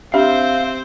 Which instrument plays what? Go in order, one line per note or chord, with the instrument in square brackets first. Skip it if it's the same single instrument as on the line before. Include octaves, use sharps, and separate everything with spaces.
[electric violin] C4 C5 [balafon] D4 G4 [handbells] E5 [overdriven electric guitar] F5